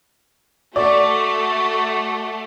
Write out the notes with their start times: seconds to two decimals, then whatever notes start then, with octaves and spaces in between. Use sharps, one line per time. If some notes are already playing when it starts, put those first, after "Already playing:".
0.76 A3 F#4 D5